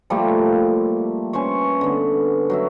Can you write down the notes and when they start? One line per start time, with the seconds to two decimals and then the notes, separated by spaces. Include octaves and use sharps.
0.10 F3 G3 A3 A#3
1.33 C#4 B4 C5 C#6
1.81 D3 B3
2.50 F#3 F#4 E5